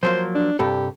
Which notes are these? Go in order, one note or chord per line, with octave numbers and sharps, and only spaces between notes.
F3 F#3 A#3 C5
D4
C2 G2 G4 A4